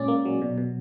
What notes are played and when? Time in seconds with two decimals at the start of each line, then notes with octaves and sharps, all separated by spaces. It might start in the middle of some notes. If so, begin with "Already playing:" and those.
Already playing: A#2 G#3 C#4 D5
0.08 A#3
0.25 F#3
0.42 B2
0.58 B2